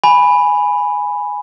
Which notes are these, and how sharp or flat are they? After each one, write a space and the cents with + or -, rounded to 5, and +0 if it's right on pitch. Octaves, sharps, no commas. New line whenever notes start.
G#5 +0 B5 +0